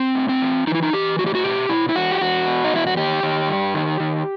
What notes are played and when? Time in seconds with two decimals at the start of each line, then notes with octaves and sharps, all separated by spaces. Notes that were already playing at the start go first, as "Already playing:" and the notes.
Already playing: C4
0.15 A2
0.29 C4
0.42 E3
0.67 E3 D#4
0.74 E4
0.82 D#4
0.93 E3 G4
1.19 A2 F#4
1.27 G4
1.35 F#4
1.44 B2 G4
1.69 B2 E4
1.89 E4
1.95 E2 F#4
2.11 G4
2.21 E2 F#4
2.47 B2
2.64 D#4
2.73 E2 E4
2.87 F#4
2.97 D#3 G4
3.23 D#3
3.49 G2
3.74 D#3
4.00 D#3